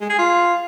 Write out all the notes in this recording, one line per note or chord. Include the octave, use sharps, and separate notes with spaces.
G#3
G#4
F4